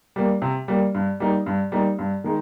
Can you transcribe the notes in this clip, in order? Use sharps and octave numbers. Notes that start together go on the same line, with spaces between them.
G3 A#3
C3
G3 A#3
G2
G3 A#3 D#4
G2
G3 A#3 D#4
G2
D#3 G#3 D#4